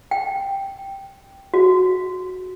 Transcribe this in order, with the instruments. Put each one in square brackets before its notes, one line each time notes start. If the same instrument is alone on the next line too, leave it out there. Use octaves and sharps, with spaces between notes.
[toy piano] G5
F#4